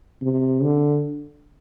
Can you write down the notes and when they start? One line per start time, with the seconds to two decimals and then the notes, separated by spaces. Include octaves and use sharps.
0.22 C3
0.62 D3